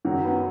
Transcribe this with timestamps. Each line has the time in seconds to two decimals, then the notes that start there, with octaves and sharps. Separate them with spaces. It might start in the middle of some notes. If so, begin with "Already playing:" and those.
0.05 F#2 D#3 F#3
0.24 B3